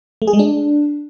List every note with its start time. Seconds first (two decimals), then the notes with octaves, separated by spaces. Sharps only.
0.22 A3
0.27 G#4
0.33 G#3
0.39 D4